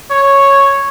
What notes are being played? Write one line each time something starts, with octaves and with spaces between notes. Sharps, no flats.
C#5